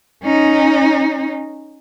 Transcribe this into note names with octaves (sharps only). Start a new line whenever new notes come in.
C#4 D#4